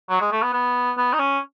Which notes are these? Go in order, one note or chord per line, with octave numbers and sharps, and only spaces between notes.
F#3
G#3
A3
B3
B3
B3
D#4
C#4